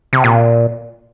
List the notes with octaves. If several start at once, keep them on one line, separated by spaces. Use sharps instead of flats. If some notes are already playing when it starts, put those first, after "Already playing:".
C3
A#2